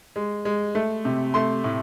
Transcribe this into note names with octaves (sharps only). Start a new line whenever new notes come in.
G#3
G#3
A3
C3
A3 C6
A2